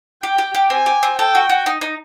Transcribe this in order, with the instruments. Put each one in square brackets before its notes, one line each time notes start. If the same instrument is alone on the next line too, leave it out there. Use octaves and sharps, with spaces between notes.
[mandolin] G4 [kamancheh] G5
[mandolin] G4
G4
[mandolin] C4 [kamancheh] G#5
[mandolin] G4
C4
[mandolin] A4 [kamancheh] G5
[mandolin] F#4
F#4
D#4
D#4